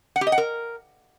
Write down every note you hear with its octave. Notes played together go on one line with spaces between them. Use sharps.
F#5
G4
D#5
F#5
A#4